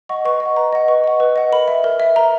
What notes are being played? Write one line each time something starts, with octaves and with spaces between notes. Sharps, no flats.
D#5 F#5 C#6
B4 C#6
D#5
F#5
B4 A#5
D#5 F#5
B4 C#6
D#5 F#5
B4
D#5 F#5
A#4 B5
E5
A#4
E5
A#4 A#5